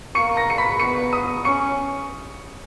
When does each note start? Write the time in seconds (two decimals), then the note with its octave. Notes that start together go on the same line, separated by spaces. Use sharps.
0.15 A#3 C#6 C#7
0.36 A#5 A#6
0.50 C#7
0.58 B5 B6
0.80 B3 C#6 C#7
1.13 D#6 D#7
1.45 C#4 C#6 C#7